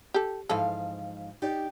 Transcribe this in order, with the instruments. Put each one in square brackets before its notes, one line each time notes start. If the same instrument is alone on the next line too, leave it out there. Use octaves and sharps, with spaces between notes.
[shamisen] G4 A4
[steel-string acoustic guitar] G#2 F3 F5 [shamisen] E3 A4
[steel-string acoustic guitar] D#4 G4 D5